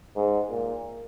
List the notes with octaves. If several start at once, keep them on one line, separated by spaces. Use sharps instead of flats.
G#2
A#2